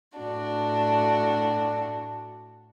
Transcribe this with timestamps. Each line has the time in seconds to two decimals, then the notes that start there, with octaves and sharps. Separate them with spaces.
0.17 A2 D4 F#4